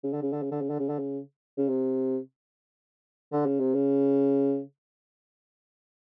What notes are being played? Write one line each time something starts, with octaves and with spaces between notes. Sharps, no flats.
C#3
D3
C#3
D3
C#3
D3
C#3
D3
C#3
D3
C#3
C#3
C3
D3
C#3
C3
C#3